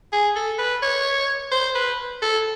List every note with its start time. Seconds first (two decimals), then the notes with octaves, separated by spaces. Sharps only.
0.13 G#4
0.36 A4
0.59 B4
0.83 C#5
1.52 C5
1.75 B4
2.22 A4